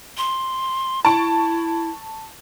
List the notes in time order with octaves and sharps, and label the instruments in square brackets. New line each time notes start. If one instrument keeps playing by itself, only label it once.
[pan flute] C6
[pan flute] E4 [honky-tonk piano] A5 C#6 D7